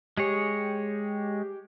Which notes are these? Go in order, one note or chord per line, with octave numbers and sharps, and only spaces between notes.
G#3 G4 G#4 C#5